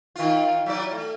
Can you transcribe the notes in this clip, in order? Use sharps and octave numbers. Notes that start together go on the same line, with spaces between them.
D#3 F4
F#3 E4 D5
A3